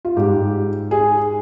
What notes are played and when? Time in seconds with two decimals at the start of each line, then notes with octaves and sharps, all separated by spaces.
0.05 F4
0.17 G#2 G3 G4
0.91 G#4